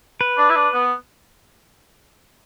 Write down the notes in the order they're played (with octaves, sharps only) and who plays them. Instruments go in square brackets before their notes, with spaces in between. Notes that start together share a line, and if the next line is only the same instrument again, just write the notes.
[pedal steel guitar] B4
[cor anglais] D4
E4
D4
B3